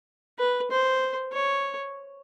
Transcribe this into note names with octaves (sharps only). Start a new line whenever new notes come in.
B4
C5
C#5